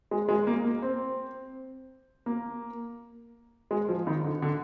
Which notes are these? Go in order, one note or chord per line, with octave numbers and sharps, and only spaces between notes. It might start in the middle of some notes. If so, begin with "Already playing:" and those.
G#3
G#3
A#3
A#3
C4
A#3
G#3
F3
D#3
D3
D3